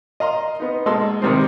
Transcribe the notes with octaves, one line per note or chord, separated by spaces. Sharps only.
D#5 F5 A#5 C6
B3 D#4
B2 G#3 A#3 A4 C6 E6
C3 D#3 G3 G#3 C4